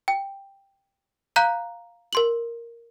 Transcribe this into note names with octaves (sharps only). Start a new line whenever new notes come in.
G5
F5 A#5 F#6 G6
A#4 C6 F#7